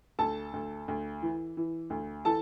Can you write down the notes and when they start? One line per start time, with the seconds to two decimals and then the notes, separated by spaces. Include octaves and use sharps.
0.19 D2 A4 A5
0.53 D2
0.88 D2
1.22 E3
1.57 E3
1.90 D2
2.25 E3 A4 A5